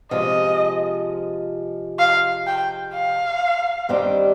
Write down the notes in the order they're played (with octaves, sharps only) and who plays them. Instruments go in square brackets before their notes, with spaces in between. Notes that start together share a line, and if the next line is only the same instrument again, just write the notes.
[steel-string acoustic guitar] C3 F3 G#3 [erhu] D#5
[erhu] F5
G5
F5
[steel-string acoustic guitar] G2 D#3 G3 C4 G4